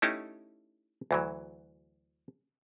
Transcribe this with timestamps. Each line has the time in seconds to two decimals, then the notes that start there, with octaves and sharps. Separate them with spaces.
0.02 A3 C#4 D#4 E4 G4
1.11 D2 E3 F#3